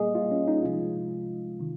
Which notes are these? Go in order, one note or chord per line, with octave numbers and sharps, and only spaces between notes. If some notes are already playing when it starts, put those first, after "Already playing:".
Already playing: A#2 G3 A#3 G#4 D#5
F4
C#4
D#4
C2 C3 F3 G#3 F4
C3 D#3